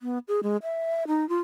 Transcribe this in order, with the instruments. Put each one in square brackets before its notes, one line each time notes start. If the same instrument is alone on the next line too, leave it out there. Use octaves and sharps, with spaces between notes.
[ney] B3
G#4
G#3
E5
D#4
F4